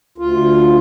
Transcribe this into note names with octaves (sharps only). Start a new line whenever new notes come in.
D2 F4